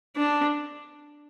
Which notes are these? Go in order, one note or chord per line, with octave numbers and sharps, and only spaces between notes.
D4